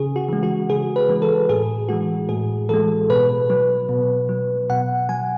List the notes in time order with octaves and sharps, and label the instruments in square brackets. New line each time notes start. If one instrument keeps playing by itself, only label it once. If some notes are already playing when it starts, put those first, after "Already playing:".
Already playing: [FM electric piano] C#3 G#4
F#4
E3 G#3
F#4
C#3 G#4
B4
E3 G#3
A4
A2 G#4
E3 G#3 F#4
A2 G#4
E3 G#3 A4
B2 B4
F#3
B2
F#3
B2 F#5
F#3 G#5